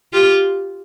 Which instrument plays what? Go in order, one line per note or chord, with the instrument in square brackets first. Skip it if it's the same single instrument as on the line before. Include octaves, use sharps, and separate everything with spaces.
[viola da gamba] F4 G4